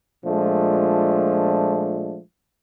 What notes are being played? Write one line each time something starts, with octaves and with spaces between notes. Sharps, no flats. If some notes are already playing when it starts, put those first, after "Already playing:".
A#2 F3 G#3 A3 D4